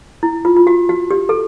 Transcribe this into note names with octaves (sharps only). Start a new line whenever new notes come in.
E4
F4
F4
F#4
F#4
G4
A4